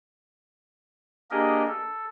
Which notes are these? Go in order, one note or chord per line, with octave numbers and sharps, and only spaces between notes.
A#3 D4 G4 G#4 A#4 D#5
A4